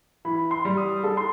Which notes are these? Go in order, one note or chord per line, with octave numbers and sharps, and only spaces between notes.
E3 B5
C6
G3
D#6
A4
C6